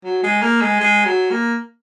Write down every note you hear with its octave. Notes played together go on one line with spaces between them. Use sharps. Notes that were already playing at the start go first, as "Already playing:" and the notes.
F#3
G#3
A#3
G#3
G#3
F#3
A#3